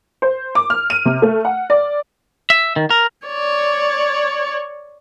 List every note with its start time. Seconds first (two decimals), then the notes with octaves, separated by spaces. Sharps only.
0.22 C5
0.55 D6
0.70 F6
0.90 D#7
1.05 C3
1.22 A3
1.45 F#5
1.70 D5
2.50 E5
2.76 D#3
2.90 A#4
3.27 C#5 D5